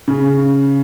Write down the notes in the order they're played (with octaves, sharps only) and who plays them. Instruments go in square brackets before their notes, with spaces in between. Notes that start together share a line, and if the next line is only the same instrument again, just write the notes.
[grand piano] C#3